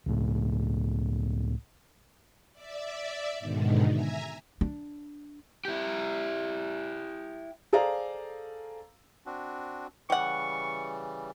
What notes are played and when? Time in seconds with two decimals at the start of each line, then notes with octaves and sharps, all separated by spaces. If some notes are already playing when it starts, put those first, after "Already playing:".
0.06 C#2 A2
2.53 D5 E5
3.39 G#2 B2 D3 D#3
3.89 E5 G#5 A#5
4.61 D4
5.65 E4 G4
7.73 G#4 A4 C5 D5 F5 A#5
9.26 C4 D4 F#4
10.10 C#3 E3 G3 G4 F#5 C#6